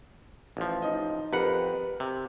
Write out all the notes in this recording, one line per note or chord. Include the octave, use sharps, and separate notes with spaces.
A1 F3
D#4 D#5
F2 G4 A#4 B4 F#5
C3